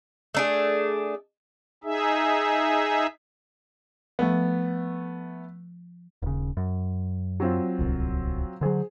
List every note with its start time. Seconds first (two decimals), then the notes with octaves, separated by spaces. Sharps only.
0.35 A3 D4 G#4
1.84 D#4 G#4 E5
4.19 F3 A3 B3
6.22 D#1 C#3
6.57 F#2
7.40 F#3 C4 F4
7.79 D1 C2
8.61 D3 F#3 G#4 C5